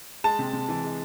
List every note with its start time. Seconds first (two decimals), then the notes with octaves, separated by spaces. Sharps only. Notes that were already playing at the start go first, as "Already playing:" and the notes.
0.24 G#3 A5
0.39 C3
0.53 C3
0.69 E3
0.84 G#3